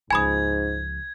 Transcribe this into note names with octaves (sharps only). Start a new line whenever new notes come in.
C#2 G#2 F3 G#5 B5 D#6 G#6